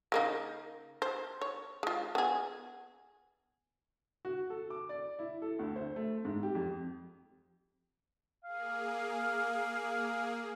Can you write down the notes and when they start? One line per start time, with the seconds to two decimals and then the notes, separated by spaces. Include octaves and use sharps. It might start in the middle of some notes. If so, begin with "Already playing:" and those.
0.12 C#3 A#3 D#4
1.02 C5
1.41 C#5
1.83 G#3 F4
2.15 B3 G#4
4.25 F#4
4.50 A4
4.70 D6
4.89 D5
5.19 E4
5.42 A4
5.59 D2
5.76 C5
5.96 A3
6.25 G#2
6.43 G4
6.55 F2
8.44 A#3 G#4 F5